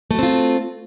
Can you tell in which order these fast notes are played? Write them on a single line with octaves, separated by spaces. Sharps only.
A3 F#4 C4 F4